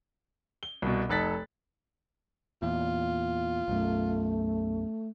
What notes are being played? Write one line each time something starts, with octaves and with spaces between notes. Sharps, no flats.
G7
C2 B2
F1 D#4 A4 F#6 A6 B6
E2 A#2 F4
B1 F#2 A3